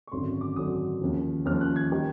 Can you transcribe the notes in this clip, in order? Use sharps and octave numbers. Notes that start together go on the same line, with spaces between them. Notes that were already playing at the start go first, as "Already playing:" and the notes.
C#6
G#1 F#2 D3 F#3 C6
D6
G#1 F#2 D3 F#3 D#6
D#2 C#3 F3
D#2 C#3 F3 F6
F#6
G#6
D#3 G3